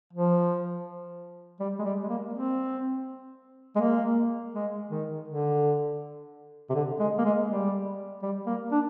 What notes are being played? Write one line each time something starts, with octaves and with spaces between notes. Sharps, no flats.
F3
G3
G#3
G3
G#3
A#3
C4
G#3
A#3
G#3
D#3
D3
C3
D3
G#3
A#3
G#3
G3
G3
A#3
D4